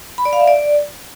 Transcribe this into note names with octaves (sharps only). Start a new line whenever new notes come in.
B5
D5
F5
E5
D5